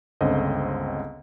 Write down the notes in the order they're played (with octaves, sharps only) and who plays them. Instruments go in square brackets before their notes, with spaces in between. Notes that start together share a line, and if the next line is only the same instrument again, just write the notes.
[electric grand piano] G1 C#2 D3 C4 D#5